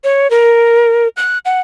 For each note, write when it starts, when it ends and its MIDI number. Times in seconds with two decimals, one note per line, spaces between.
0.04 0.30 73
0.31 1.08 70
1.17 1.38 90
1.45 1.61 78